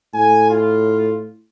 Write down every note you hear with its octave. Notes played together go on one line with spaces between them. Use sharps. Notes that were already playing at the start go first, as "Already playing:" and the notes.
A2 G#5
F4